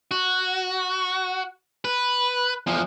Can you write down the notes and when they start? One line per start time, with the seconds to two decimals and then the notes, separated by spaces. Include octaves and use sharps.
0.11 F#4
1.85 B4
2.67 E2 F3